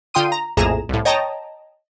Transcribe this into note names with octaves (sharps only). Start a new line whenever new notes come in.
D3 F4 G5 C6 D#6 D#7
A#5
A#1 F2 A2 G#4 A#5 E7
C2 A2
C#5 D#5 G5 A5 A#5